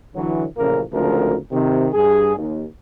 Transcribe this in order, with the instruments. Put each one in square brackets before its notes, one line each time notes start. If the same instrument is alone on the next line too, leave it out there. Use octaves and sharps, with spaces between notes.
[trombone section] D3 E3 F#3
A1 A#2 C#3 F3 A#3 A#4
G#1 D2 C#3 F3 A3 A#4
C3 D#3
G2 G#4
D#2